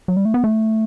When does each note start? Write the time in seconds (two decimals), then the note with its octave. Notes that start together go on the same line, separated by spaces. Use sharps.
0.08 F#3
0.17 G3
0.25 A3
0.34 B3
0.44 A3